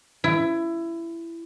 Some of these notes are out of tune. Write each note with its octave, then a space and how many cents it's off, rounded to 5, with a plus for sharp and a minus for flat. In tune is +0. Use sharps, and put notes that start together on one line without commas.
E4 +20